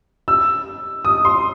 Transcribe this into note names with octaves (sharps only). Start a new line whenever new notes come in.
E6
D#6
C6